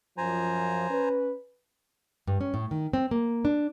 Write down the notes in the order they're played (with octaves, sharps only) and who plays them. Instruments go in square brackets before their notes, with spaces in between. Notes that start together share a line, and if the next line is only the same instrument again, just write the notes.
[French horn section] F#2 F3 [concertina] C5 G#5 A#5
[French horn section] C#4 B4
[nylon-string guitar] G2
C#4
A2
D#3
C4
A#3
D4